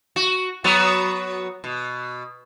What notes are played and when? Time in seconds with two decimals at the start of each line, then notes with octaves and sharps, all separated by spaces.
0.16 F#4
0.64 F#3 B3 F#4
1.64 B2